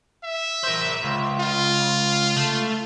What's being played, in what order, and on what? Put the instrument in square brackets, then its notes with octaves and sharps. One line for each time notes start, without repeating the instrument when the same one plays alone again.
[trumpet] E5
[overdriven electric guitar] A#4 C5
C#2
[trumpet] F4
[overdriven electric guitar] A3